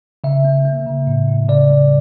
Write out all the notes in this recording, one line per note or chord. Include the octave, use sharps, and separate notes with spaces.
C#3 E5
A#3
A#3
C#3
A2
A2
C#3 D5
G3